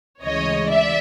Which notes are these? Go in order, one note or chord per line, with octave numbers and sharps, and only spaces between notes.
D2 C#3 E3 G#3 C#5 D#5
D5 E5